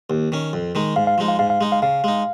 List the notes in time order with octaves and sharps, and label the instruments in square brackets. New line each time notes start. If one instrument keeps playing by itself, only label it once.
[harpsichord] D#2
D#3 C#4
F2
D#3 G#3 D#4
[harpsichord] G#2 [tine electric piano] F5
[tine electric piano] F5
[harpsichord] F3 G#3 D#4
[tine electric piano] F5
[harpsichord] G#2 [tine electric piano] F5
[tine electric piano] F5
[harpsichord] G#3 D#4
[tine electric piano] F5
[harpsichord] C#3 [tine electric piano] F5
[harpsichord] G#3 D#4